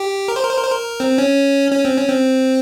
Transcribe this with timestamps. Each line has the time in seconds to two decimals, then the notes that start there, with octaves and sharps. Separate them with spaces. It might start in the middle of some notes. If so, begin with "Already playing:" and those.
Already playing: G4
0.28 A#4
0.36 C5
0.43 A#4
0.50 C5
0.58 A#4
0.64 C5
0.72 A#4
1.00 C4
1.18 C#4
1.72 C#4
1.85 C4
1.97 C#4
2.09 C4